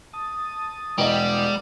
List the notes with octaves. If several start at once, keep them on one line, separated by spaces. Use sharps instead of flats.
A5 D#6
E1 G3 G#3 D#5